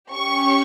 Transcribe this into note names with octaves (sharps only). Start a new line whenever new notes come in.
C#4 G4 C#6